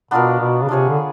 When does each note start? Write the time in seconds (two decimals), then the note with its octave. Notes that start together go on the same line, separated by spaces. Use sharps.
0.11 B2 B3 D4 F4 A#4
0.40 B2
0.63 C#3
0.69 C3 D4 F4 G#4 C#5
0.89 D3